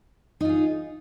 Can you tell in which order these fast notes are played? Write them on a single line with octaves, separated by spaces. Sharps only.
D#4 F4 G#4